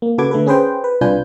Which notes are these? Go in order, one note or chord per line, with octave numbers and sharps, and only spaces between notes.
A#3
C#3 F#4 A4 B4 D6 G#6
D3 A3 A4 B4
C#4 G#4 B4 C5 G5
B4
C2 D4 F4 B4 G#5 G6